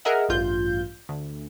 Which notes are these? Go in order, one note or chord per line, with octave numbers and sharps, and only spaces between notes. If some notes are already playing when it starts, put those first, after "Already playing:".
G#4 A#4 D#5 E5 F#5
A1 G2 F4 G6
D2